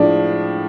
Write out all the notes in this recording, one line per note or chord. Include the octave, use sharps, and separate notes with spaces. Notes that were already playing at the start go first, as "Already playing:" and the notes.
Already playing: A2 F3 G#3 D4